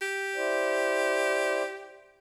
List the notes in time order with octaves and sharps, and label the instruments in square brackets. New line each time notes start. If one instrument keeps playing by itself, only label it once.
[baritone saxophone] G4
[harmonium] E4 C5 D5